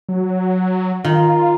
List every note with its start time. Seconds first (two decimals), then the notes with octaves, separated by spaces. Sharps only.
0.09 F#3
1.04 D#3 F4